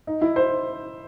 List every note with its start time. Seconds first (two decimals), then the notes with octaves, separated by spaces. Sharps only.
0.07 D#4
0.22 E4
0.36 C5